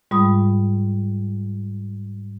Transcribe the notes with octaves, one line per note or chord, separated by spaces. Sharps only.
G#2 G3 G#3 F4 B5 D#6